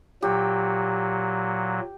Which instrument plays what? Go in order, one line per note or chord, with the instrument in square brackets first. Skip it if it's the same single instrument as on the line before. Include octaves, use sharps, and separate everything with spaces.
[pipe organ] A#2 F#3 [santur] G4